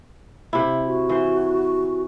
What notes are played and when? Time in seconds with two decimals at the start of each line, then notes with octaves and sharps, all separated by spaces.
0.53 C3 E4
0.86 F#4
1.09 E3 C5